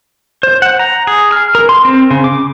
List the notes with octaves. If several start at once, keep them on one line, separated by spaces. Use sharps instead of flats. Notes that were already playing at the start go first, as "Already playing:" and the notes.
C5
F#5
A#5
G#4
F6
A#4
C6
C4
C#3
D6